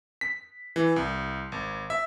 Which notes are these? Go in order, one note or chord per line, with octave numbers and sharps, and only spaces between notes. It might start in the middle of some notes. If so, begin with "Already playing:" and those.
B6
E3
C2
G#1
E5